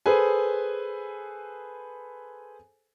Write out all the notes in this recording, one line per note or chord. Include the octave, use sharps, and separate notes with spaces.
G#4 A4 B4 C5 G#5